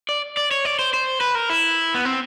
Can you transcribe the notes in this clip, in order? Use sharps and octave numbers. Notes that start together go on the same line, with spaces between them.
D5
D5
C#5
D5
C5
C5
B4
A#4
E4
B3
C4